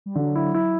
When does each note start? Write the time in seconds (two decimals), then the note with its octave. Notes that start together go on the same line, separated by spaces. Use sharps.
0.06 G3
0.15 D3 F#3
0.36 E4
0.54 E4